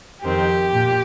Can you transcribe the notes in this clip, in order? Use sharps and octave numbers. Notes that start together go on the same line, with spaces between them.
F2 D#3 C4 G4
A#2